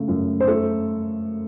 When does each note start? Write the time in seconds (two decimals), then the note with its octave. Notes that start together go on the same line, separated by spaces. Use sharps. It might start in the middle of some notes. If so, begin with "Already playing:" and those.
Already playing: C#3 A3
0.08 F#2
0.40 C5
0.48 A3 A4